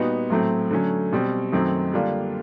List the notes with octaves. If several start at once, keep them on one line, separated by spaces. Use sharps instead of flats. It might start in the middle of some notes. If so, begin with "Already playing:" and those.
Already playing: A#2 G3 B3 D#4 F#4
A2 F#3 A3 C4
D3 F#3 A3 C#4
B2 G3 C4
F#2 D#3 F#3 A3 C4
D3 G3 A#3 D4 F4